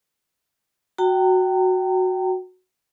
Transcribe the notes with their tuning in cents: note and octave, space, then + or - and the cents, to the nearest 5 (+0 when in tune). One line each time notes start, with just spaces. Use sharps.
F#4 -5 G5 -20 A#5 -40